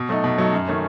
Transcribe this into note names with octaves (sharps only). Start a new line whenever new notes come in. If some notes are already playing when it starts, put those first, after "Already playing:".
Already playing: B2
F#3 A3 D#4
B2
F#3 A3 D#4
F#2
D#3 A3 C#4